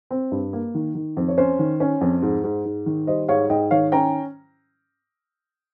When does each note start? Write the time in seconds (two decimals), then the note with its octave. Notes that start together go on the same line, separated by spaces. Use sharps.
0.11 C4
0.32 G2
0.53 A#3
0.75 D#3
0.95 D#3
1.17 F2
1.28 C#5
1.38 C#4 C5
1.59 D#3
1.80 C#4
2.01 F2
2.22 G#2
2.44 G#2
2.65 G#2
2.86 D#3
3.07 G3 C5 D#5
3.28 G#2 C#5 F5
3.50 G#2 D#5 G5
3.71 D#3 C#5 F5
3.92 C#4 G5 A#5